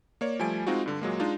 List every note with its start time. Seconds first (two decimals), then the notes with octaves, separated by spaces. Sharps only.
0.21 A#3 C#5 D5
0.39 F3 G3 A3 G#5 D7
0.67 G#3 C4 D#4 F4 F#4
0.86 G2 D3
1.01 A#2 F#3 G#3 A#3
1.20 G#3 D4 D#4 F4